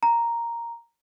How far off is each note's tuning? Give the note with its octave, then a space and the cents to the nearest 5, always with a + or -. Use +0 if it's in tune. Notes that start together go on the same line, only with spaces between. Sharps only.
A#5 +0